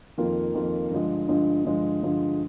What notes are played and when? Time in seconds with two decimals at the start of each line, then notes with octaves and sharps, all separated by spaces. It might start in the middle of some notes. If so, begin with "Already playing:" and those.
0.18 F2 D#3 A#3 F4
0.54 F2 D#3 A#3 F4
0.91 G2 D3 F3 G#3
1.28 G2 D3 F3 G#3
1.65 G2 D3 F3 G#3
2.03 G2 D3 F3 G#3